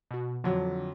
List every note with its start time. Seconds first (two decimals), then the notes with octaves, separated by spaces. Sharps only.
0.11 B2 F#4
0.44 F2 D3 F#3